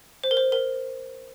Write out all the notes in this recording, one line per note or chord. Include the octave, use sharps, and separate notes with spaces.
C5
A#4
C5
A#4